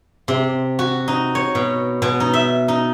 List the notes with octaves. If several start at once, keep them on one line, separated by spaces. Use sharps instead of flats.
C3
F#4
D#4
C#5
B2
B2
D#4
E5
D#4